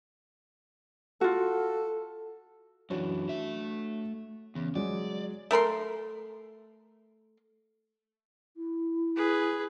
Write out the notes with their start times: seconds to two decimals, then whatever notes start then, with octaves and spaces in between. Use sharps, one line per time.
1.21 F4 F#4 A4
2.90 F#2 E3 D4 F#4 C#5
3.29 A3 E5
4.55 E2 C#3
4.75 F#3 G#3 D5
5.51 A3 A#4 B5 C6
8.57 E4
9.16 G#4 B4